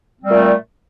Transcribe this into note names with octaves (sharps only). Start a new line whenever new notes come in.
A#2 G3 A3 C4